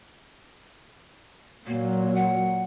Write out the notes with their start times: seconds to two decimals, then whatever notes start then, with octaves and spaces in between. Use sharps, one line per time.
1.66 A#2 F#3 A#3
2.15 F#5